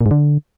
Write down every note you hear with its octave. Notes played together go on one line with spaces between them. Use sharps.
A#2
G#2
D3